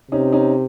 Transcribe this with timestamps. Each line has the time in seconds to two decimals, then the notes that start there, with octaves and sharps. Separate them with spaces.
0.11 C3 C#4 D#4
0.32 C#4 D#4